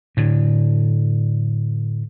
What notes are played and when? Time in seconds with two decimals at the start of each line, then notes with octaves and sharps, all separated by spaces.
0.17 A2 D3